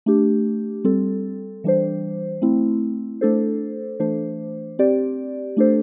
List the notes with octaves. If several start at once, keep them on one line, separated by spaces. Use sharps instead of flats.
A3 D4 G4
G3 C4 A4
E3 G3 D4 C5
A3 C4 E4
A3 D4 A4 C5
E3 A3 D4 C5
C4 G4 D5
A3 D4 A4 C5